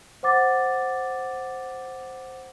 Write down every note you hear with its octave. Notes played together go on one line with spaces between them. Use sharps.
C5 F#5 D6 A6